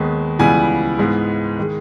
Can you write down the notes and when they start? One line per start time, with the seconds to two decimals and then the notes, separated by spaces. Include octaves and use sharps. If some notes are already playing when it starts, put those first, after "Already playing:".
Already playing: D#2 D#3 G#3 B3
0.39 C#2 C#3 E3 G3 B3 G#5
0.99 G#2 E3 G#3 B3
1.58 D#3 G#3